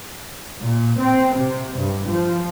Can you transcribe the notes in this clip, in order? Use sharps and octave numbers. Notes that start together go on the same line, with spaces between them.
A#2
C4
C3
G2
F3